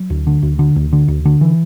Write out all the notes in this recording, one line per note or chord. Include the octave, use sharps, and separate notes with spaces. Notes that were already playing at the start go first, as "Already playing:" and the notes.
Already playing: F#3
D2
D3
D2
D3
D2
D3
D2
D3
E3